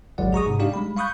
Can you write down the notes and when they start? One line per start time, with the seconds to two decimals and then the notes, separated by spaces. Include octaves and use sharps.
0.18 G#1 C#2 F#3 D5 F#5
0.33 G#4 A#5 C#6 D#6
0.46 G#2 C3
0.59 D4 D#4 G4 D5 F5
0.74 G3 G#3 B5
0.97 F5 B5 C#6 D#6 F#6 G6